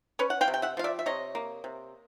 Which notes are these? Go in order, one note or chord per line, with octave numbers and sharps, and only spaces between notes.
C#4 B4 C#5
F#5
F5 G5
C3
G5
E5 F#5
F3 F5
D5 E5
E5
C3 C#5 D#5
A#3
C3